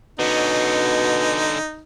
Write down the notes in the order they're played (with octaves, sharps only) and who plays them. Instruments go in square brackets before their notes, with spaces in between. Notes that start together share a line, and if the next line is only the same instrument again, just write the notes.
[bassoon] B2 [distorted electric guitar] D3 C#4 [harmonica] D#4